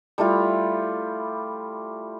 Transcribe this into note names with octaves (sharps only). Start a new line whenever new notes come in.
G3 A3 E4 F4